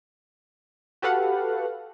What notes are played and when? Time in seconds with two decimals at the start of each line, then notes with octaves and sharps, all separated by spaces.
1.02 F#4 G4 A4 B4 F5 F#5